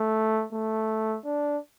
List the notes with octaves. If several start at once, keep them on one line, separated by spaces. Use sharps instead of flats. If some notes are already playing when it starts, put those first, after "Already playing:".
Already playing: A3
A3
D4